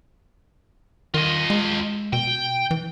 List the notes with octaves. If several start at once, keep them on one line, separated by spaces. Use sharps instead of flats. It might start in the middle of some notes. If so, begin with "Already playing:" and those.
D#3 F4 D#5
G#3
B2 G5
E3